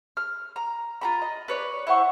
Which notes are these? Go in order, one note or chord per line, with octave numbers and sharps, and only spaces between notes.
F6
A#5
F4 A#5 B5
D#5
B4 C#5 D5
E4 C5 F#5 C#6